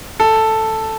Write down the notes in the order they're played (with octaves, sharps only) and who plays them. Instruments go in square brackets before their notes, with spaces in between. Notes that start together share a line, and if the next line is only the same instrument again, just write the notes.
[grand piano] A4